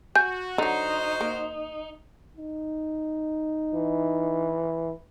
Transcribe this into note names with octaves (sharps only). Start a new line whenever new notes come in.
F#4 G#5 G6
D3 F#3 D#4 F#4 C5
A#3
D#4
E3